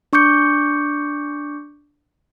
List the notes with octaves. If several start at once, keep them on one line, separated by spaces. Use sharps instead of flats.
D4 C#6 D6 G6 C#7